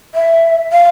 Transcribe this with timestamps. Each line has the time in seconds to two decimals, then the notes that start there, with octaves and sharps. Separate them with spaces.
0.15 E5
0.73 F5